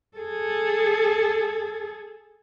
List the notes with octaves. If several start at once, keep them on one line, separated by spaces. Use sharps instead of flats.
G#4 A4